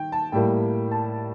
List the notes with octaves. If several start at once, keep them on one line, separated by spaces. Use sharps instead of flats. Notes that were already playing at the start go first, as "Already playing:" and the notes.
Already playing: D#3 G5
A5
A2 G3 A#3 G5
A5